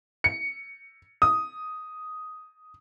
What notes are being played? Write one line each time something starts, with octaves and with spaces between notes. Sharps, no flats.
C#7
D#6